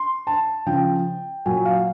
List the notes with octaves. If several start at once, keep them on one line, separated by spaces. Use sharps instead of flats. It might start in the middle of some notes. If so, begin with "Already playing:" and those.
Already playing: C6
A5
C#3 F3 G5
A#2 F#3 G#5
F5